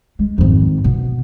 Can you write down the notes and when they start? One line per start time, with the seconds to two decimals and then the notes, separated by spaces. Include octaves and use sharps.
0.19 G#3
0.38 G#1 F2
0.84 B2